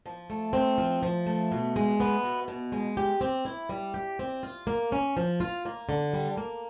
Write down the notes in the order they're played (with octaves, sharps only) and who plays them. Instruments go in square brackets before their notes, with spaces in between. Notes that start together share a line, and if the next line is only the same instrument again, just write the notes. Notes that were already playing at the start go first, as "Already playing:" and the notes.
[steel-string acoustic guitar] F3
A3
C4
F3
F3
A3
B2
G#3
B3
B2
B2
G#3
G4
C4
E4
G3
G4
C4
F4
A#3
C#4
F3
F4
A#3
D3
G3
A#3